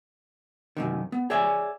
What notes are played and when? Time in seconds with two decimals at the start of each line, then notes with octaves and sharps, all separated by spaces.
0.77 F#2 C3 D#3
1.12 B3
1.30 G#4 C#5 D5 E5 G#5